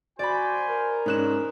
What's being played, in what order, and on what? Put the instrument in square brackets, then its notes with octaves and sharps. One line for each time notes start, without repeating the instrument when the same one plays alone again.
[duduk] F#4 [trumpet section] C5 G#5 [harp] D5 B5
[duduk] A#4
[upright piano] G#2 C#4 [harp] D#4 F#6 E7